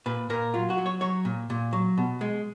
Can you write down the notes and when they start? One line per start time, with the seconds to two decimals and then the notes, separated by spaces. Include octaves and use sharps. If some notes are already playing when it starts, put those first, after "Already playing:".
0.06 A#2 B4
0.30 A#2 A#4
0.54 F#3 F4
0.70 F#4
0.78 F#3
0.86 C#5
1.01 F#3 C#5
1.25 A#2
1.50 A#2
1.73 F#3
1.98 B2
2.21 G#3